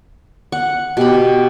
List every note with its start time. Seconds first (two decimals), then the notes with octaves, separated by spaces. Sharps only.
0.52 F#5
0.97 B2 G4 B5